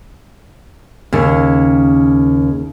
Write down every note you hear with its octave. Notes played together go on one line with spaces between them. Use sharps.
D#2 C#3